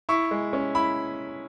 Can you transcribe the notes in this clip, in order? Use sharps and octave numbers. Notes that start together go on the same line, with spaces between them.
E4 C#6
G#3
C#4
E4 B5